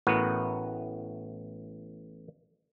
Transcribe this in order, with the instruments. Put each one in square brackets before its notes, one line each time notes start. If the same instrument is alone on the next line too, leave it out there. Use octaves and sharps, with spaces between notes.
[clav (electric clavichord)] A1 A2 B3 F#4 A#4